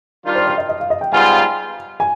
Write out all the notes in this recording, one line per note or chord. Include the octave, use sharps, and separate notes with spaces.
D#3 G3 D4 F4
C5
D5
D#5
D#5
F5
D#5
G5
G#2 G3 B3 F4 G#5
G#5